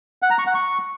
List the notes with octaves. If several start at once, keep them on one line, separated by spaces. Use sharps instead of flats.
F#5
A#5
C#6
F#5
C#6